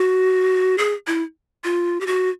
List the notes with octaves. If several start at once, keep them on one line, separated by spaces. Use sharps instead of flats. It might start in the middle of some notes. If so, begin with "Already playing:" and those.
Already playing: F#4
G#4
E4
F4
G4
F#4